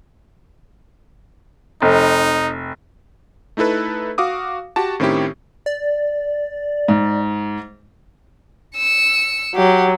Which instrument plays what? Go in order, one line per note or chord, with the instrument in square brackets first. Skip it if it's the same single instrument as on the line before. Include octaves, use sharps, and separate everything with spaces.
[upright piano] F1 [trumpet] D#4
[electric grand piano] A3 D#4 E4 A4 B4
F#4 F5 D6 D#6
F#4 G4 A5
A2 D#3 C4 C#4 E4 G4
[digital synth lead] D5
[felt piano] G#2
[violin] E6 C#7
[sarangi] F#3 [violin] G4